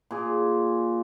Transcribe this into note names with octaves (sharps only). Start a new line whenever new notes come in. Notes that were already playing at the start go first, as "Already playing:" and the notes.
A#2 G#4